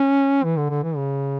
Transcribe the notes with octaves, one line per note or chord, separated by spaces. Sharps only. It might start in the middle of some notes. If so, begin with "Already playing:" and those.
Already playing: C#4
E3
D3
D3
E3
C#3